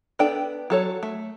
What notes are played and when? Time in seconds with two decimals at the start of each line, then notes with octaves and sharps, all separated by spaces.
0.19 B3 D4 A4 D5 G5
0.70 F#3 A4 C#5
1.03 A3